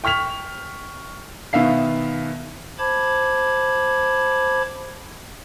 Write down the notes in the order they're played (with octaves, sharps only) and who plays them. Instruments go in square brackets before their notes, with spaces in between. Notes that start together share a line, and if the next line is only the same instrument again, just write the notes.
[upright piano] G5 C#6 F6 B6 F7
B2 D#3 B3 E5 F5 C7
[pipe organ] C5 A5 B5 D6 G#6